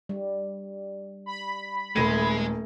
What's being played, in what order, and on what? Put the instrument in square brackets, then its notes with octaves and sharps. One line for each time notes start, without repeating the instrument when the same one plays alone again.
[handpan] G3
[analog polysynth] B5
[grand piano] D#1 A#6 D#7 [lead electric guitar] G#3 [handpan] A3